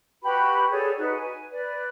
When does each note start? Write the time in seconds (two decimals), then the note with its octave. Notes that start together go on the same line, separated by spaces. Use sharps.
0.22 F#4 G4 B4 B5
0.70 G#4 A4 C#5 D5
0.97 D#4 F#4 B4
1.14 G#5
1.50 B4 D5